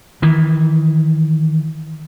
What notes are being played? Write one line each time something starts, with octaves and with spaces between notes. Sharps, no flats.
D#3 E3